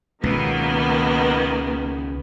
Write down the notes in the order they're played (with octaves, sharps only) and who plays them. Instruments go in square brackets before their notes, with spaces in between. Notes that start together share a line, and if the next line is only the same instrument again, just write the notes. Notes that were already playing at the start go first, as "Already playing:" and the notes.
[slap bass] C#2 B2 [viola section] D#3 A#3 B3